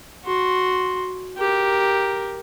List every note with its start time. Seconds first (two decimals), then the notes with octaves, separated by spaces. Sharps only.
0.24 F#4 C6
1.38 G4 A#4